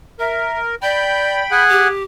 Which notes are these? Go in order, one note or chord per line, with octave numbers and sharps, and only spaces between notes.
A#4 E5
D5 G5 B5 G6
G#4 F#5 G#5
G4